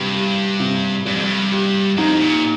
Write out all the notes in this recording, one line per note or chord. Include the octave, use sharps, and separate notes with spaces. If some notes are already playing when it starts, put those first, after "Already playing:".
Already playing: G2 C3 G4
G4
C3
G2 G3
F2
G2
G4
F2 D#4
A#2